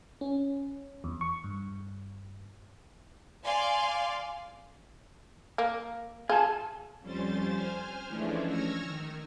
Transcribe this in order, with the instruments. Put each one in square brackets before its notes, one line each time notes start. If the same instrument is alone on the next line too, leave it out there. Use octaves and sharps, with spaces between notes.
[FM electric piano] C#4
E2
C#6
G2
[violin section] D5 F5 G#5 C6
[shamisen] A#3
[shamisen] F4 [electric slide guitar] G#4 A5
[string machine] F2 G3 C#4 C5 A6
C5 G#5 F6
E3 F3 G#3 A3 C#4 D4
C#6 E6 F6 G#6 A#6
D#3